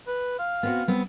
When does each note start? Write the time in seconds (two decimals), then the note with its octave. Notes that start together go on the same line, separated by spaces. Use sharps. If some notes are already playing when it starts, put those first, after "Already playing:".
0.07 B4
0.39 F5
0.63 B3 C4 F#4
0.88 G3 B3 C4